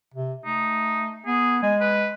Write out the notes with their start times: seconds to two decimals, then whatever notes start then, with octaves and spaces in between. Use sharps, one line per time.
0.14 C3
0.45 A3 D#4
1.26 B3 G#4
1.63 G#3 G#5
1.80 B4